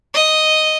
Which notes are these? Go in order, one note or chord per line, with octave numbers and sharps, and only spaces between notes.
D#5